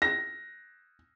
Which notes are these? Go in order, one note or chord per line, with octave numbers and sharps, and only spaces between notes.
A#6